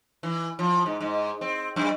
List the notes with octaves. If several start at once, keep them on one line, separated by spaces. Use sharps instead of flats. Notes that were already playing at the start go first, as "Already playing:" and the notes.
E3
F3
G#2
G#2
C4
F#2